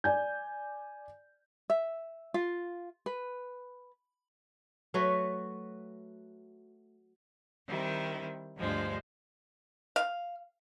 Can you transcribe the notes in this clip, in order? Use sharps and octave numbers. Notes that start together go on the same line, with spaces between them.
D5 G#5 G6
E5
F4
B4
F#3 A3 F#4 B4
D#3 G3 C4 E4
D2 G2 F3 G#3 C5
F5